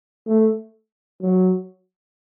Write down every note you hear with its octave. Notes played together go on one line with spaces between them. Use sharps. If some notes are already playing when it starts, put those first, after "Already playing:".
A3
F#3